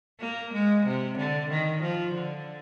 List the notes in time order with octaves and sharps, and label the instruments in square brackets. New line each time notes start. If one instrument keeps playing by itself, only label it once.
[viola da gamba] A#3
G#3
C3
D3
D#3
F3
D3